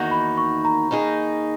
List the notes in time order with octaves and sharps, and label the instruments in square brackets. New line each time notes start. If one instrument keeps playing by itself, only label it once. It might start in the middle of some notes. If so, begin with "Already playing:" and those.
Already playing: [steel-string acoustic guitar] E2 D#3 A#3 D#4 F#4
[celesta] B5
C#6
A#5
[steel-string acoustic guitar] D#3 A#3 D#4 G#4